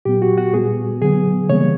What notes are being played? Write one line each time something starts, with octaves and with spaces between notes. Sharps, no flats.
A#2 F#3 B3 G4
F#4
F#4
A#2 G3 B3 G#4
D3 F#3 B3 G#4
C#3 E3 G3 A#3 C#5